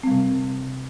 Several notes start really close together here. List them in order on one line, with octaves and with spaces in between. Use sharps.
C4 G3 C3